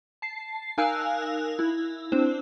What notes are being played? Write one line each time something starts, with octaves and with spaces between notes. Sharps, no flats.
A5 C7
D#4 A#4 F5 G#5 E6 F#6
E4
C4 D4 C5